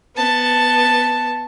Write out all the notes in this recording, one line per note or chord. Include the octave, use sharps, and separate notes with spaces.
B3 A5